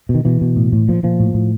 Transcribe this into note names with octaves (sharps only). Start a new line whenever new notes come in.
B2
D#3
B2 E3
B2
A2
A2
A#2 F3
A#2 F3
A2
A2